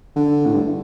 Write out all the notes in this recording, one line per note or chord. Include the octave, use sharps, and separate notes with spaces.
D3
A2
G2